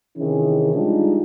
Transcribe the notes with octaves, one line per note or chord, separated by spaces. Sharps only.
C3 D#3 E3 C#4 E4 G#4
G3 G#3 D4 D#4 F4